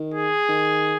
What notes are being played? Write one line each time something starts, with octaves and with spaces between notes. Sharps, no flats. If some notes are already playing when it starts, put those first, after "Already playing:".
Already playing: D#3
G#4
D#3